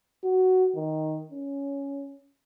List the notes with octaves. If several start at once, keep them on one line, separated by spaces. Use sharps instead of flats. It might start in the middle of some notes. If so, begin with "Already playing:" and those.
F#4
D#3
C#4